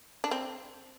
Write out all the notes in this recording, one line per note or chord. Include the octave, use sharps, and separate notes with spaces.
D4
C4